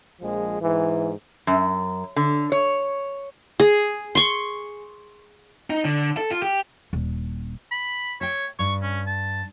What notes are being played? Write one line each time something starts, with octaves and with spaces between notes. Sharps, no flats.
A#1 F3 G#3
G#2 E3
F#2
D3
C#5
G#4
C6 C#6
D#4
D3
A4
F4
G4
D#1 D4
B5
C#5 E5 G5
G2 C#6
C#4
A5